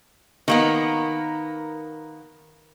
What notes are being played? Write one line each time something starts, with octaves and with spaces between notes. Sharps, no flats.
D#3 A#3 B3